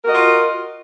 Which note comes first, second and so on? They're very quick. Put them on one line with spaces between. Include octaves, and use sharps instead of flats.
A#4 F#4 D#5 F4